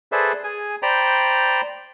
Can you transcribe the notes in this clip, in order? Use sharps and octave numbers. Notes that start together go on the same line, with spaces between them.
G#4 A4 B4 C5 D5 E5
G#4 G#5
C5 D5 G5 A#5 B5